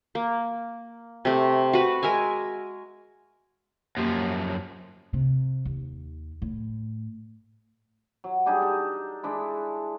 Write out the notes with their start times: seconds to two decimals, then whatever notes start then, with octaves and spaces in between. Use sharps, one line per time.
0.15 A#3
1.25 C3 A3
1.73 F#4 B4
2.03 G#3 A#4 E5 G#5
3.97 F#2 F3 A#3 G4 C#5
5.13 C3
5.65 D#2
6.42 A2
8.24 F#3
8.46 G3 D4 D#4 G#4
8.62 A4
9.23 G#3 D4 E4